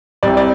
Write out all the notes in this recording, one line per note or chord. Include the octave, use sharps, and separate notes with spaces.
C2 C3 G3 D5
D5